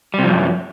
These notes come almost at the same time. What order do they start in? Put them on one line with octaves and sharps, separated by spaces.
G3 C3 F3 F#2